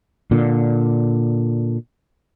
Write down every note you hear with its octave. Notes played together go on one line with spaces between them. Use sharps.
A#2 D3